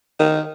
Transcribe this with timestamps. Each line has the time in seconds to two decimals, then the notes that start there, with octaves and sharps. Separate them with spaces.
0.19 D#3